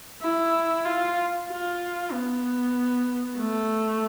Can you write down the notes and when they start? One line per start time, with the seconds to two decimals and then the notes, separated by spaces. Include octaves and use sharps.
0.22 E4
0.85 F4
1.48 F4
2.12 B3
3.38 A3